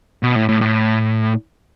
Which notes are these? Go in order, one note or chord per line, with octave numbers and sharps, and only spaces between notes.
B2
A2
A2
A2